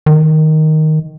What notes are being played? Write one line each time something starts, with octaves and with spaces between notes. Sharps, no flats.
D#3